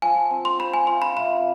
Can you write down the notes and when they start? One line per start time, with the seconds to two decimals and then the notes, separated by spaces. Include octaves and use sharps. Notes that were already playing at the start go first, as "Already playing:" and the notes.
0.02 F3 G#5
0.31 C4
0.45 C6
0.60 C5 B5
0.74 G#5
0.87 F4 C6
1.02 B5
1.17 C3 B5